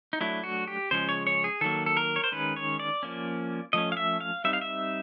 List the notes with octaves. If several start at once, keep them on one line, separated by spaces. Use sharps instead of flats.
D#4
F#3 A3 D4 E4
F#4
G4
C#3 F3 G#3 C#4 C5
C#5
C#5
G#4
D#3 F#3 A#3 A4
A4
A#4
C#5
C5
D#3 G#3 C#4 B4
C#5
D5
F3 A#3 C#4
F3 A3 C#4 D#5
F5
E5
F5
G3 C4 D#4 E5
F5
E5